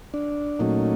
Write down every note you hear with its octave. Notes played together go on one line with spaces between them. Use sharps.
D4
A#2 F#3 A3 C#4 D#4